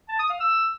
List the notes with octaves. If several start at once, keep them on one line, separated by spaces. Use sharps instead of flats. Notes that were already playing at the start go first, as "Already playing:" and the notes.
A5
D#6
F5
E6